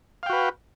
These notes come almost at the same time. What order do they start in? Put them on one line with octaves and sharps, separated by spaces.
F5 G5 F#4 B4